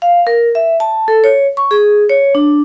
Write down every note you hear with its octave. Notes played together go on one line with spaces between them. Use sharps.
F5
A#4
E5
A5
A4
C#5
C#6
G#4
C#5
D4